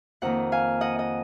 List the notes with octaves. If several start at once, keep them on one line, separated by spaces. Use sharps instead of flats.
F2 D#3 A#3 F#5 A#5
F5 G#5
D#5 F#5
D#5